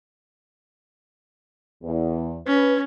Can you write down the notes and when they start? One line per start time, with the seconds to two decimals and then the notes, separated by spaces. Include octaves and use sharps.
1.83 E2
2.47 C#4 B4